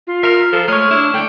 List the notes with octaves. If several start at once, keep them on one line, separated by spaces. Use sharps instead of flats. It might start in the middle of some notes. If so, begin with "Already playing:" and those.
F4
A#4 E5 A#5 F6
F3 A4
G#3 A3 C#5 C#6 F6
D4 E4
D3 A3 G5